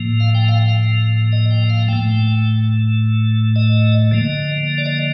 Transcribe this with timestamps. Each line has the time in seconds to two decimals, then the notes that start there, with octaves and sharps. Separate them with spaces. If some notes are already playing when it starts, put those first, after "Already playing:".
Already playing: A2 F3 A#3
0.20 F5
0.35 G5
0.49 F5
0.63 F5
1.32 D#5
1.51 G5
1.70 F5
1.88 A2 A3 G5
3.56 D#5
4.11 D3 F3 A#3 D#5
4.78 D5
4.86 D#5